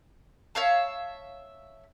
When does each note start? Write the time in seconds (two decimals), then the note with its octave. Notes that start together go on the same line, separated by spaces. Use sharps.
0.55 C#5 E5 F5 A5